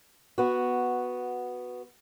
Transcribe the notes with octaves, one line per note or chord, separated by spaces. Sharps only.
B3 F#4